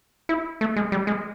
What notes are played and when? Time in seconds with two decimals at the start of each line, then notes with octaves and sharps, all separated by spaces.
0.29 E4
0.61 A3
0.76 G#3
0.92 G3
1.07 G#3